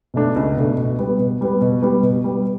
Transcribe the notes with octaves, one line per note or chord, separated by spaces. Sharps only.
B2 A3 D4
C#2
B2 A3 D4
B2
G3 B3
B2
G3 B3
B2
G3 B3
B2
G3 B3